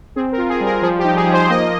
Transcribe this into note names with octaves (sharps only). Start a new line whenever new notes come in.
C4 G#4
A#4
F4
G#4
G3
A#4
F3 G#4
G4
D#4
G#4
F3
C5
A#3 D#5